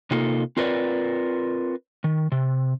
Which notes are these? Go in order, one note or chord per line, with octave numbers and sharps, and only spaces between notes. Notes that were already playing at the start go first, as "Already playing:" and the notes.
C3 A#3 D#4 F4 A4
C4 F4 A#4 B4 C#5 D5
D#3
C3